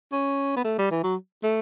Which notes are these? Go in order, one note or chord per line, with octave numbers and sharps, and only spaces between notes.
C#4
B3
A3
G3
E3
F#3
A3